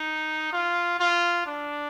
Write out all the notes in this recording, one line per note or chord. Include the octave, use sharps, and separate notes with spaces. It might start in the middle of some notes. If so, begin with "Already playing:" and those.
Already playing: D#4
F4
F4
D4